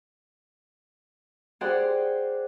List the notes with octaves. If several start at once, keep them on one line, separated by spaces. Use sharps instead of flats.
G4 G#4 C5 D5 F#5 C6